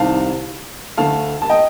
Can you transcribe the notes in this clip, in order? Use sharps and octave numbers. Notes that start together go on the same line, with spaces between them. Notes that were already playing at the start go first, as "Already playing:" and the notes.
Already playing: C2 C3 D#3 F5 A5
D2 D3 A3 F5 A5
A5
D#5 G5